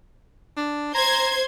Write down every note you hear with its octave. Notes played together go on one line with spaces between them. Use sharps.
D4
C5 A#5 C6 G#6